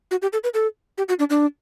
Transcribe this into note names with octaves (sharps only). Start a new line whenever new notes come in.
F#4
G4
A4
B4
A4
G4
F#4
D4
D4